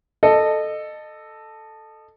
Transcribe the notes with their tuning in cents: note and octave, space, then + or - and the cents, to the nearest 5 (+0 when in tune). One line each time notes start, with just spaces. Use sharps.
A4 +0 D#5 -25